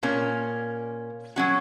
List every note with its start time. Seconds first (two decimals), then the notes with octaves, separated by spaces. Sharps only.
0.03 A#2 A#3 C#4
1.36 F#3 C#4 F#4